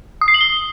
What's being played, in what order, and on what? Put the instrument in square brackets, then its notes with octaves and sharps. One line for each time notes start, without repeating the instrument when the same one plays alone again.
[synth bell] D#6
C7
F#7
G7